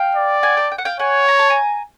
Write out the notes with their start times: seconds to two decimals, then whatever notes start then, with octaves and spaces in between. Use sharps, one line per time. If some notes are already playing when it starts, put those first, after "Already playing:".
Already playing: F5 G5
0.15 D5
0.43 F#5 G#5
0.57 G5 A5
0.72 G5
0.78 F#5
0.85 F5 G5
0.99 C#5 F#5 G#5
1.28 A#5
1.39 A5
1.50 G#5 A#5